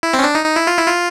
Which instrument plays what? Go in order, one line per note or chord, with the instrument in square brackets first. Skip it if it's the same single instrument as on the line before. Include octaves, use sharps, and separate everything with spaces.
[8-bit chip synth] E4
C4
C#4
D4
D#4
D#4
E4
F4
E4
F4